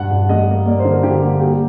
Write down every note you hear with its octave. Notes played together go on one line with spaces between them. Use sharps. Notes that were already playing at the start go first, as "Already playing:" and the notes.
Already playing: G2 F#5
G2
G3 D#5
A#3
A#3 D5
C5
D3
A#4
D3 G4
A#3
A#3 G4